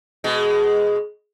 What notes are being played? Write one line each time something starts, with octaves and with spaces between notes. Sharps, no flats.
B2 G#3